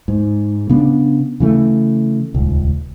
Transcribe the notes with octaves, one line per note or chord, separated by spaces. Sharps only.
G#2
C#3 B3 C#4 D4
C#3 E3 A3
D#1 C#2